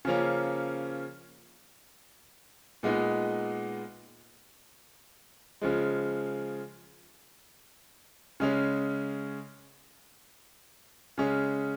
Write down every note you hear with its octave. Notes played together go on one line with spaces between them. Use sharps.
C#3 F3 A#3 C#4
A#2 G#3 B3 D#4
C#3 F3 G#3
C#3 G#3 C#4
C#3 G#3 C#4